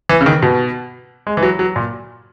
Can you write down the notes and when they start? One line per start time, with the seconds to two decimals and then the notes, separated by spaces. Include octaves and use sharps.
0.09 E3
0.21 C#3
0.26 D#3
0.43 B2
1.27 G#3
1.37 E3
1.43 F#3
1.59 F#3
1.76 A#2